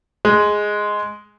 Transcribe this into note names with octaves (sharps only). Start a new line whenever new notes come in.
G#3